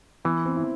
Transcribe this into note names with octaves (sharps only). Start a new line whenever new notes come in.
E3 B3
C4
E4